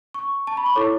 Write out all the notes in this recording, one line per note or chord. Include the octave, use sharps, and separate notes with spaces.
C#6
A5
B5
C#6
E4 A4 C#5 D6